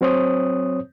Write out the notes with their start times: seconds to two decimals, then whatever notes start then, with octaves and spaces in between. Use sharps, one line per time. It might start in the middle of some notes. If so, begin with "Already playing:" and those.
0.01 F#3 C4 C5 C#5 D#6